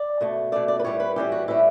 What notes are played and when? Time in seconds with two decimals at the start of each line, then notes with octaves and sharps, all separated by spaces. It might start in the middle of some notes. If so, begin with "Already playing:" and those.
Already playing: D5
0.21 B2 A3
0.52 B2 A3 D5
0.68 D5
0.80 B4
0.84 A2 E3 G3 C#5
1.00 B4
1.16 A2 E3 G3 G4
1.32 F#4
1.48 A2 E3 G3 E4